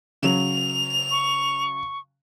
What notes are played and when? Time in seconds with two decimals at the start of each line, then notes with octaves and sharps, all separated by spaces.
0.23 C#3 F#3 F7
1.11 C#6